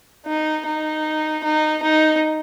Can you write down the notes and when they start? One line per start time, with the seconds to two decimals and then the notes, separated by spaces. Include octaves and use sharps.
0.27 D#4
0.65 D#4
1.44 D#4
1.82 D#4